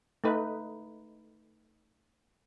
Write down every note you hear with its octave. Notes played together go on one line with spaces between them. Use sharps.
A3 D#4 B4